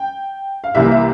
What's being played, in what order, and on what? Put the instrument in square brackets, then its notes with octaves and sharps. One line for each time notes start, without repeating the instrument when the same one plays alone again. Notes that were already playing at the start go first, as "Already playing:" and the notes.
Already playing: [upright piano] G5
F5
C2 C3 E3 A#3 E5
E5